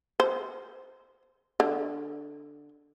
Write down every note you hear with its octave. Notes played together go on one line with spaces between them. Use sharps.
C5
D3